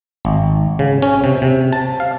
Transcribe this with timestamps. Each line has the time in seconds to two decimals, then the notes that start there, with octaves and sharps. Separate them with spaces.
0.25 G#1
0.79 C#3
1.02 C#4
1.24 C3
1.42 C3
1.73 A5
2.00 F5